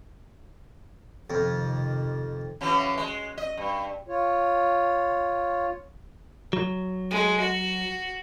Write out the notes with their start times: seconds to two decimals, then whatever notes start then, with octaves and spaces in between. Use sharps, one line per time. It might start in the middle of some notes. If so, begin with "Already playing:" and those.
1.30 F2 C3 D#3
2.61 C#3 E3 F#3
2.97 G#3
3.38 D#5
3.57 G2
4.08 F4 C#5
6.53 F#3
7.11 G#3
7.40 F#4